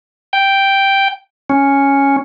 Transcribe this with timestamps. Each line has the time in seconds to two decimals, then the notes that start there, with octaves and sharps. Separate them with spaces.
0.33 G5
1.50 C#4